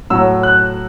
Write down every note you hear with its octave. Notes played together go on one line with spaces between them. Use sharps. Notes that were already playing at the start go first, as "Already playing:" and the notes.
A2 F#3 E6
F#6